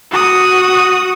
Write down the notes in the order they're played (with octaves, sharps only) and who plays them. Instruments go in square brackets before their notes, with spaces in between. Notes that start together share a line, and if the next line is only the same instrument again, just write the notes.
[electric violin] F#4 D#6